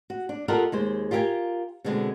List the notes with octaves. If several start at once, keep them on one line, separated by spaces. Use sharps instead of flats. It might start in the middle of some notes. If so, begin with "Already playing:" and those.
F#4
D4
F4 G4 A4 A#4 D#5 F#5
D#2 G#3 C5
F4 G4 A#4 D#5 G5 G#5
B2 D3 G#3 B3 C4